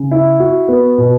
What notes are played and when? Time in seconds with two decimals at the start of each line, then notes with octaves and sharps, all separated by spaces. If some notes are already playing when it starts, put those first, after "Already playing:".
Already playing: C#3
0.11 E4
0.40 F#4
0.68 B3
0.98 B2